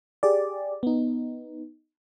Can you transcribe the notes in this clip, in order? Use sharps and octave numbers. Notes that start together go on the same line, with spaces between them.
G4 G#4 D5
B3 D#4